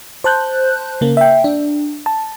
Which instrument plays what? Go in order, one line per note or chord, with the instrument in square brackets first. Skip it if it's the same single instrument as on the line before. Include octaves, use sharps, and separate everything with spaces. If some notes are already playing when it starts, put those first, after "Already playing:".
[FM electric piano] C5 A5 F#6 G6
C#3 A#3
E5 G5
D4
A5